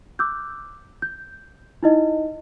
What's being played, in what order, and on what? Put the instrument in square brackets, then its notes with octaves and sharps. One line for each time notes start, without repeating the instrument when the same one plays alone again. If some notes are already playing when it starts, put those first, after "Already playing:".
[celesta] D6 E6 F#6 G6
G6
D#4 E4 D#5